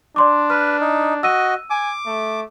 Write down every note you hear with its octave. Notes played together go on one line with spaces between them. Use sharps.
D4 D5 C6 D6
B4 F6
D#4
F#4 D#5 E6 D#7
G#5 D6
A3